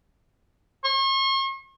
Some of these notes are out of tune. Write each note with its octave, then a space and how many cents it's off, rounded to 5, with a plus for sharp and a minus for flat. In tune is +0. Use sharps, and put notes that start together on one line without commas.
C#6 -45